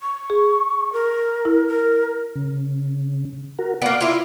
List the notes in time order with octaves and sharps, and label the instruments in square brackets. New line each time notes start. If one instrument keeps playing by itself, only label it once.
[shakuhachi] C#6
[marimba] G#4
[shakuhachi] A#4
[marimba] E4
[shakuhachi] A#4
[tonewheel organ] C#3
F#4 A#4
[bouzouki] A#3 B3 [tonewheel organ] D5 F5 D6
[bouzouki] E4 F4